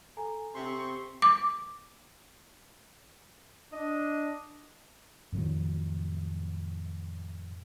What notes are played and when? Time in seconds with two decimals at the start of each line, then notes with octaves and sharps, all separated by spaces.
0.17 A4 G#5 A#5
0.55 C3 C4 C6 C#6
1.22 D6
3.72 D4 D#5
5.32 F2 A2 D#3 F#3